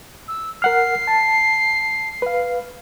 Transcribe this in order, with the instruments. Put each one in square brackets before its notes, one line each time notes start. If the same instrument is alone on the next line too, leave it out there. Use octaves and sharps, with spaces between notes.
[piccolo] E6
[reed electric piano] A#4 F#5 F6 [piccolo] C7
[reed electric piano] A5
B4 F5